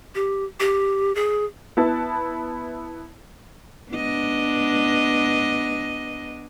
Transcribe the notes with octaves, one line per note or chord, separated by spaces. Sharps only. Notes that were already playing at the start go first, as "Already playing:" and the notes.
G4
G4
G#4
B3 E4 B4 A5
B3 D4 D#5